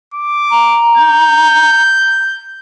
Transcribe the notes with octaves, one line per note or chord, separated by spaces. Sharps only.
D6
A#5
G6